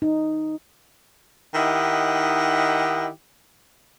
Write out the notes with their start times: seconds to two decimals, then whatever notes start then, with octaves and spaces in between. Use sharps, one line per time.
0.02 D#4
1.55 D#3 D#4 E4 G4 F#5